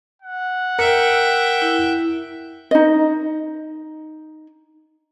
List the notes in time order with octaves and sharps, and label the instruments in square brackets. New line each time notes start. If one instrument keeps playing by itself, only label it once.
[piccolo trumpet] F#5
[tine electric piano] A#4 C#7 [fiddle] E5 G5
[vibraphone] E4
[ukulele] D#4 D#5